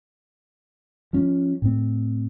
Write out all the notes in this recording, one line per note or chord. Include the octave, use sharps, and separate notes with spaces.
F3 C#4
A2 C4